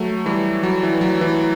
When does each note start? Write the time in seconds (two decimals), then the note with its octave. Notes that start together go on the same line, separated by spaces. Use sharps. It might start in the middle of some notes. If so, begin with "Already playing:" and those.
Already playing: F#3 A3
0.26 E3 G3
0.63 F#3
0.83 E3
1.01 F#3
1.21 E3